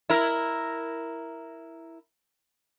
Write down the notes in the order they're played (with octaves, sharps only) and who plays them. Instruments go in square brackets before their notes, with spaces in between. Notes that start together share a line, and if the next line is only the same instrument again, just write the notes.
[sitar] E4 A#4